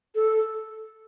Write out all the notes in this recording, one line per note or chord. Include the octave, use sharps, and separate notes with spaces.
A4